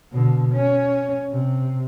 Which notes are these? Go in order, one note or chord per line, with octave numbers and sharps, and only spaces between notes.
B2 D3
C#4
C3